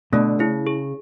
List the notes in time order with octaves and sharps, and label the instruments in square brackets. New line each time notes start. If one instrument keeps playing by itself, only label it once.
[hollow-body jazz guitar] B2 D3 [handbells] A3
[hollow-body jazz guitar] C#3 [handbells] E4
[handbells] G#4